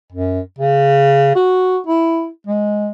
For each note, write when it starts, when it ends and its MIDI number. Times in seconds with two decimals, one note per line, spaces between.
0.12 0.40 42
0.58 1.32 49
1.35 1.78 66
1.87 2.29 64
2.47 2.91 56